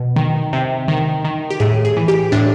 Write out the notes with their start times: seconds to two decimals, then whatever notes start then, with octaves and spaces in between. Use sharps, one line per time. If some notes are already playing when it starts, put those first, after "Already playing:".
Already playing: B2
0.16 D#3
0.53 C3
0.88 D#3
1.25 D#3
1.51 G4
1.60 A2 G#4
1.85 G#4
1.97 E3
2.08 G4
2.32 A2 D4